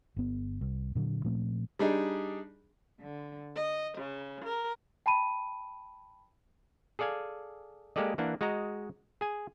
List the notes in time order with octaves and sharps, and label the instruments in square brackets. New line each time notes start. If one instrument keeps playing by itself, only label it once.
[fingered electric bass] G1 B3
C2
A#2 D3 F#3
A#2 F3 A3 C4
[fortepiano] G3 D4 D#4 G#4
[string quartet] D3
D#5
C#3
A#4
[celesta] G5 A5 B5 D#7
[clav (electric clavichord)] G#4 A4 D5 F5 G#5
G#3 A#3 G4 A4 D5 D#5
E3 A#3 D4 F#5
G#3 F#4 D#5 A#5
G#4 G#5